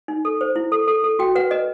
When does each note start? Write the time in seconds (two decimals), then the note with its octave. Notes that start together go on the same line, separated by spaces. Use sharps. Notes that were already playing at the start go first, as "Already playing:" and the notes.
0.08 D#4
0.25 A4
0.41 C5
0.56 E4
0.72 A4
0.88 A4
1.04 A4
1.19 F#4 G5
1.35 B4 F#5
1.51 B4 D#5